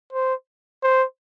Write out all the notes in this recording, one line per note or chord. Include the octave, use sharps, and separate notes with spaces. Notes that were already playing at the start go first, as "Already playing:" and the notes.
C5
C5